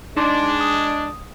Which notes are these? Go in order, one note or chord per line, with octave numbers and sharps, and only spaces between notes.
G#3 D4 D#4 C6 D6
D#6